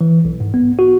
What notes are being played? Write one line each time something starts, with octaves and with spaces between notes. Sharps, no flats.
E3
B1
G#2
B3
F#4